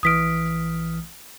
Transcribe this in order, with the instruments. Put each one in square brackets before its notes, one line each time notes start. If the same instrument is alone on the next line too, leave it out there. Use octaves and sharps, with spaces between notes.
[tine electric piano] A#1 E3 F6 [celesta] D#6 B6 D7